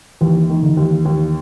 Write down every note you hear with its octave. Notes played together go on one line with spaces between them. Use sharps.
D#2 E3
D#3
D3
D#2
D#2